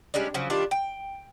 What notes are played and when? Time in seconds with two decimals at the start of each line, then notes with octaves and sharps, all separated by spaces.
0.14 G3 G#3 C#4 D4
0.34 C#3 F3 F#3
0.50 D#3 G3 D4 F4
0.71 G5